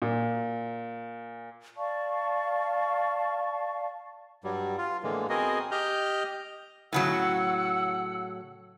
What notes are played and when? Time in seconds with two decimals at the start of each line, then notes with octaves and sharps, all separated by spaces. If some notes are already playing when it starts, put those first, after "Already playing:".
0.02 A#2
1.77 D5 F5 A5 C#6
4.44 G2 F#3 G3
4.78 F4
5.03 A2 D3 E3 G#3 A#3
5.29 B3 C4 F#4 G#4 A#4 D#5
5.71 G4 D#5 F6 G6
6.93 A2 C#3 F#3 F#5 E6